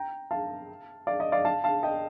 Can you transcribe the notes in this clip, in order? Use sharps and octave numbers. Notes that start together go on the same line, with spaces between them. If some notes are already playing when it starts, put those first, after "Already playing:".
Already playing: G5 A#5
F5 A5
D5 F5
D#5
D5 F5
F5 A5
F5 A5
D#5 G5